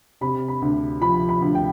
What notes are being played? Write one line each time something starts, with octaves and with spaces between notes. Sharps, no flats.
C3 B5
B5
D2
F3 B5
B5
D2
G5